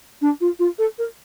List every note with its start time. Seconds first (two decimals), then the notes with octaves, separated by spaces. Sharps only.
0.21 D4
0.40 F4
0.59 F4
0.78 A4
0.98 A#4